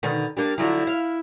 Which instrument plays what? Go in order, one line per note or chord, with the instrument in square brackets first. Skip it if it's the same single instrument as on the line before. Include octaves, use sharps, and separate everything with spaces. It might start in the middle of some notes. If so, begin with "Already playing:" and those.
[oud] B2 D3 D#3
[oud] G3 A#3 [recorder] D4
[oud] D3 F3 F#3 [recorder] E4
[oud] F5